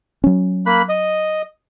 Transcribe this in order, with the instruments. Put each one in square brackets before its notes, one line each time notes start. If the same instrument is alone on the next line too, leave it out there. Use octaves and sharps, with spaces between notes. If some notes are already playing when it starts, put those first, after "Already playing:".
[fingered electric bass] F#3 C#4
[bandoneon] A#3 B5 F#6
D#5